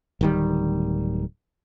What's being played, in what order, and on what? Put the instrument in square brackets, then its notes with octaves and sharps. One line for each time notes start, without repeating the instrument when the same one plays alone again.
[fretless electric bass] D1 D#3 G3